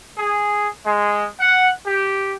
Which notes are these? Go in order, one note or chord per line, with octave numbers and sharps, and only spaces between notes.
G#4
G#3
F#5
G4